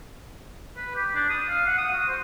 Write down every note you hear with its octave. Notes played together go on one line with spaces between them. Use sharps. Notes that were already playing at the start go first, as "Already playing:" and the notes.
B4
G4
D4
D#6
F5
F#5
D#6
F#4
C5